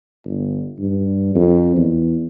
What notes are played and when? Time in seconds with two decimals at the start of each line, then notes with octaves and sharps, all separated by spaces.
0.25 G1
0.79 G2
1.35 F2
1.76 E2